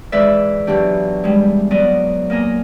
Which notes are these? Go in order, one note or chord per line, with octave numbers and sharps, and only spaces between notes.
G#2 E3 G#3 B4 D5 E5
B2 E3 F#3 D4 G4
G3 G#3
F#3 B3 D5 D#5
A#3 D#5 G#5 A#5